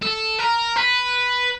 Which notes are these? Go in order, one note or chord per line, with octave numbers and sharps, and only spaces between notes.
A4
A#4
B4